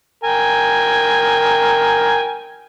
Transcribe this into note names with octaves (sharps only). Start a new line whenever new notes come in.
A#4 G5 G#5